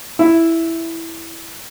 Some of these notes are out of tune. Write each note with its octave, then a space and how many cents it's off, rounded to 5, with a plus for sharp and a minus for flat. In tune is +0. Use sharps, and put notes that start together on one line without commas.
E4 +0